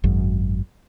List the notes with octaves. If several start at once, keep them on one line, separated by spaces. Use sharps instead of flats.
G#1 F#2